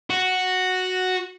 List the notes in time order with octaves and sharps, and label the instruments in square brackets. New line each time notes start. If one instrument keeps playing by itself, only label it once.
[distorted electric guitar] F#4